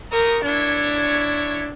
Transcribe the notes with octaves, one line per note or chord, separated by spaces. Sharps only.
G4 A#4 C#6 D#6
D4 E4 C#5